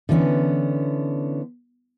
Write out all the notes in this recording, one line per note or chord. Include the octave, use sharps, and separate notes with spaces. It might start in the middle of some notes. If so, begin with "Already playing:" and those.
D3 E3 B3 C#4